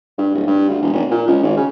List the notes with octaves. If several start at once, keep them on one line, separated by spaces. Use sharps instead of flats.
G2
D1
G2
D2
E1
F1
A#2
C#2
G#1
C#3